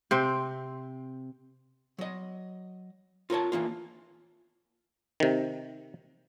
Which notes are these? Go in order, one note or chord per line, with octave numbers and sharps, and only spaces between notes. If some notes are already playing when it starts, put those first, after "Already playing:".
C3 C4
F#3 D#5
F4 A#4 C#5 A5
E3 F3 A#3 F4
C3 D#3